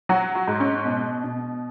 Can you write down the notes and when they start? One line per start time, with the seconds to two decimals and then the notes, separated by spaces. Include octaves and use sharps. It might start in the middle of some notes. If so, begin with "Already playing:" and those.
0.09 F#3 F#4
0.35 F#4
0.48 G#2
0.60 C#4
0.86 B2
1.24 B2